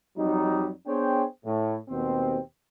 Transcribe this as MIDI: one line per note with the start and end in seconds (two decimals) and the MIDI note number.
0.17 0.70 41
0.17 0.70 54
0.17 0.70 55
0.17 0.70 63
0.86 1.23 59
0.86 1.23 62
0.86 1.23 68
0.86 1.23 72
0.86 1.23 73
0.86 1.23 79
1.45 1.76 45
1.89 2.38 39
1.89 2.38 47
1.89 2.38 60